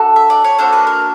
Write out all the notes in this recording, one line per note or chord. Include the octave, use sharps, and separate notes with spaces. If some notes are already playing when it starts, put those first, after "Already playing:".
Already playing: D4 F#4 A4
E5
D5
C#5
A#3 D4 F#4 A4 C5
B4
A#4